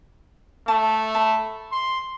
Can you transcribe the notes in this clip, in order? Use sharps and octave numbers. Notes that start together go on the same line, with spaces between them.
A3 A5
A5 B5
C6